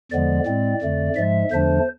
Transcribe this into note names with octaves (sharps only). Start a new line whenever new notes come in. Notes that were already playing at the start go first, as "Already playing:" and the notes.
E2 D3 F3 G#3 B3 D5
A2 G#3 C4
F2 D3 A3
G#2 F3 G#3 E5
E2 D3 F3 A3 D4 C5